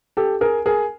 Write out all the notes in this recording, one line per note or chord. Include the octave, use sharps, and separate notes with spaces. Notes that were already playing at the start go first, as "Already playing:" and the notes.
G4 A4
G#4 A#4
G#4 A#4